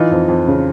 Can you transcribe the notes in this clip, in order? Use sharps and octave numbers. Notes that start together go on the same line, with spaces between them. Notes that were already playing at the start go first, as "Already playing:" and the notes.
Already playing: E3 D#4 F4
F2
F2
C#3